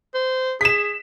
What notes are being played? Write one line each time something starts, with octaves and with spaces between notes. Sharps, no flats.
C5
G#4 B6 E7